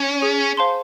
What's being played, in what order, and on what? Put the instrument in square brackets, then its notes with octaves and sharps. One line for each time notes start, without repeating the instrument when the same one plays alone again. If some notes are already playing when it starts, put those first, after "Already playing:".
Already playing: [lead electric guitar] C#4
[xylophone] G#4
C5 F5 A5 C6